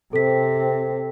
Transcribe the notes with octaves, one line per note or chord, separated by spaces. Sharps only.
C3 C4 A4 B6